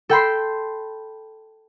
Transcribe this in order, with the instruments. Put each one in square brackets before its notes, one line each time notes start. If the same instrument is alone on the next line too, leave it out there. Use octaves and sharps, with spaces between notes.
[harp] A4 G5 B5 C6